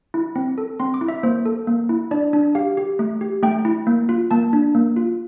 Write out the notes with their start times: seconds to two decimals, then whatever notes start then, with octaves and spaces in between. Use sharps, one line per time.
0.14 E4
0.36 C4
0.58 A4
0.80 C4 C6
0.94 D6
1.01 E4
1.08 E5
1.23 A#3 C5
1.45 A4
1.67 A#3
1.89 E4
2.11 D4 D5
2.33 D4
2.55 G4 F5
2.77 G4
2.99 A3
3.21 G4
3.43 A3 G5
3.65 E4
3.87 A#3
4.09 F4
4.31 A#3 A5
4.53 D4
4.75 A#3
4.96 F4